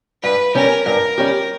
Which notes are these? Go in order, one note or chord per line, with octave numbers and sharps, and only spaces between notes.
G2 B4
G3 C#4 G4 A#4
G2 A#4
G3 C#4 G4